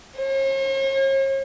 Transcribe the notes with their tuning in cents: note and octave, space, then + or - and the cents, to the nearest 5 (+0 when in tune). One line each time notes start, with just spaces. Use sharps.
C#5 -45